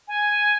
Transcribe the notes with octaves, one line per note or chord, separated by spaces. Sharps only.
G#5